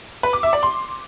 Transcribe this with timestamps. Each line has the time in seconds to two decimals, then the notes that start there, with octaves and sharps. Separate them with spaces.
0.23 B4
0.33 D6
0.43 E5
0.53 D5
0.63 C6